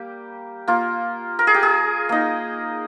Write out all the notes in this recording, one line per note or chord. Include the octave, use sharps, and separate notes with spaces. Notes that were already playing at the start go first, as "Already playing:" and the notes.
Already playing: G3 A#3 G4
A#3 F4
A#4
G#4
G4
G#4
A#3 D#4